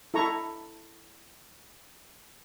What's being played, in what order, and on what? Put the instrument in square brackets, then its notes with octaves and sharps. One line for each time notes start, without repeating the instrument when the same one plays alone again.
[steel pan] E4 A4 A#5 C#6